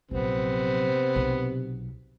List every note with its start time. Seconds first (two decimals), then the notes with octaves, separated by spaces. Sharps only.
0.11 A#1 C3 F#3 B3 C4
1.16 B1